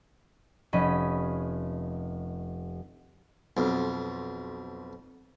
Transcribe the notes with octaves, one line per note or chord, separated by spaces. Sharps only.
F1 C#4 D#5 B5
B1 F2